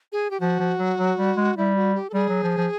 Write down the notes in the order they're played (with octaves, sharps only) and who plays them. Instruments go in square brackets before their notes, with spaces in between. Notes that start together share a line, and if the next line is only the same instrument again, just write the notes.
[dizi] G#4
G4
[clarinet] F3 [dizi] F#4
[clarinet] F3
F#3
F#3
G3
G#3
[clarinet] G3 [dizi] E4
[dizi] F#4
G4
A4
[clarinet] G3 [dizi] G#4
[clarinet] F#3
F3
F3